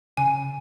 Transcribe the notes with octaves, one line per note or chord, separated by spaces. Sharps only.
C#3 G#5